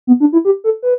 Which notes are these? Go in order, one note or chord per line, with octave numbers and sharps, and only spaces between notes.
B3
D4
E4
G4
A4
B4